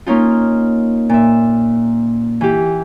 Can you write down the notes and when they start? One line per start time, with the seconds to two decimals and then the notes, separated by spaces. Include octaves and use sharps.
0.06 A#3 C#4 D#4 F4
1.09 A#2 E5
2.41 E3 G4